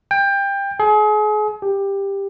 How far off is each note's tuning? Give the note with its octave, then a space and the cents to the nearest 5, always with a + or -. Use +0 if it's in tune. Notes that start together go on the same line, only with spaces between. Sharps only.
G5 +20
G#4 +35
G4 +10